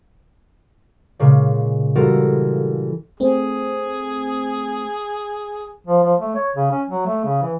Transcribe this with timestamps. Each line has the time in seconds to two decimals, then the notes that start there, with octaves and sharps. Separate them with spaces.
1.19 A#2 C#3 G#3
1.96 E3 G3 F4 F#4 A4 A#4
3.20 A3 C4 G#4
5.87 F3
6.03 F3
6.20 A3
6.35 C#5
6.56 C#3
6.71 C#4
6.89 F#3
7.07 A3
7.25 C#3
7.42 E3